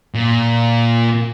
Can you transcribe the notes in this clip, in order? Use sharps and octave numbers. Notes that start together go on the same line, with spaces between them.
A#2